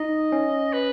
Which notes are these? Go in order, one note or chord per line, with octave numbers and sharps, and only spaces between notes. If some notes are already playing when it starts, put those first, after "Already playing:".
Already playing: D#4 D#5
C#4
B4